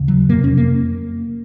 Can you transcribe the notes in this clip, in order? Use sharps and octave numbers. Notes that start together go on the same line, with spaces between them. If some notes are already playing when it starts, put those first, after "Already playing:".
Already playing: D#2 C#3
F#3
F2 C3 A#3
C#4
A#3